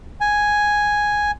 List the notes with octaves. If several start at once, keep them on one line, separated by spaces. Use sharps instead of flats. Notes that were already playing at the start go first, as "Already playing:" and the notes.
G#5